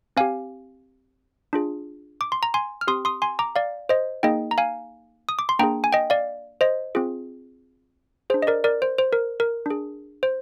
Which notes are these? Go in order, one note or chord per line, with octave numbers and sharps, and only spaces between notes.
C4 G4 F5 G#5
D4 F4 G#4
D6
C6
A#5
G#5 C6
F6
C4 G4 C6 D#6
C6 D#6
G#5 C6
A#5 D6
D5 F5
C5 D#5
A#3 D#4 G#4 D#5 G5
A#5
F5 G#5
D#6
D6
C6
A#3 D4 G#4 G5 A#5
G#5
D#5 G5
D5 F5
C5 D#5
C4 F4 G#4
D4 G#4 C5
D#5
A#4 D5
A#4 D5
C5
C5
A#4
A#4
D4 G#4
C5